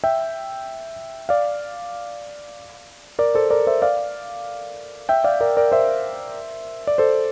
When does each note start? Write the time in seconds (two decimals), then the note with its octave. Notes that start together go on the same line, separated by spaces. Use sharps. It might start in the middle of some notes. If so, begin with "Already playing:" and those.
0.04 E5 G5
1.29 D5 F5
3.19 A#4 D5
3.35 A4 C5
3.50 A#4 D5
3.67 C5 E5
3.82 D5 F5
5.09 E5 G5
5.24 D5 F5
5.41 A#4 D5
5.57 A#4 D5
5.72 C5 E5
6.87 D5
6.98 A4 C5